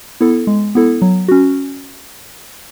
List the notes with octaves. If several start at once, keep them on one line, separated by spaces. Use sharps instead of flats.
B3 E4 A4
G#3
B3 E4 A4
F#3
C#4 F#4